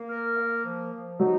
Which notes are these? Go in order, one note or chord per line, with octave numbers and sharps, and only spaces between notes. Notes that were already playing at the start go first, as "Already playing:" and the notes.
Already playing: A#3
A#4
A#3
F3
F3
F#3 D#4